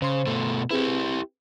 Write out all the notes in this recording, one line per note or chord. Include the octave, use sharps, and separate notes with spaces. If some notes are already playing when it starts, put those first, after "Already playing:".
C#3 C5 C6
B2 A3
C4 E4 G4 G#4 B4